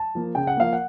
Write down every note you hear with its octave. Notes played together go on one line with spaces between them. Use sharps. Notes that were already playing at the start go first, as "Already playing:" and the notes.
Already playing: A5
F3 A#3
C#3 G5
F#5
F3 A#3 F5
F#5